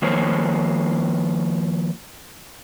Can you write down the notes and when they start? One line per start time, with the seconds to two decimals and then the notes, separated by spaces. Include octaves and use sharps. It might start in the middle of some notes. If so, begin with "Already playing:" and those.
0.02 D#3 F3 A#3 C5 C#5